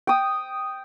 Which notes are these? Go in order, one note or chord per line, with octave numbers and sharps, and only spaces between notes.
G5 D#6